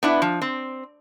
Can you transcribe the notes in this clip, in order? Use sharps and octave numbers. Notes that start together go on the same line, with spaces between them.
B3 D4 E4
F3
C4